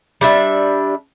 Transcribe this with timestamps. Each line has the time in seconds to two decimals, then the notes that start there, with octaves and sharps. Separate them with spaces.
0.21 G3 D4 E5